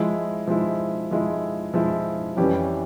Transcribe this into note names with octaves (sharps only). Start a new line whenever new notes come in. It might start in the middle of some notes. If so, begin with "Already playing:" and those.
Already playing: F3 G#3 E4
F3 G#3 E4
F3 G#3 E4
F3 G#3 E4
F2 E3 G3 C#4 G4